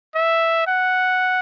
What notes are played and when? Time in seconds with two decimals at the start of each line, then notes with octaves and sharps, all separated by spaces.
0.15 E5
0.67 F#5